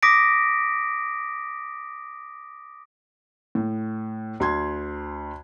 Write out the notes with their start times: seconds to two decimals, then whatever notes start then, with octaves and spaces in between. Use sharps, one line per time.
0.03 D6 D#6 A#6 B6 D7
3.55 A2
4.40 D2 C6 G#6